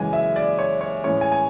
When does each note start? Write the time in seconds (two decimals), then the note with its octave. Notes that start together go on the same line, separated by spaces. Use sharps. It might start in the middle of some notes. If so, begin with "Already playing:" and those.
Already playing: F#2 C#3 E3 G#3 G#5
0.13 E5
0.36 D5
0.59 C#5
0.81 C#5
1.04 A2 E3 G#3 C#4 C#5
1.21 G#5
1.32 G#5